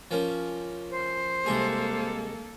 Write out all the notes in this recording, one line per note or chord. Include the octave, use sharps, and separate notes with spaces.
F3 A#3 C#4
C5
C2 G#3 A#3 G#4 A4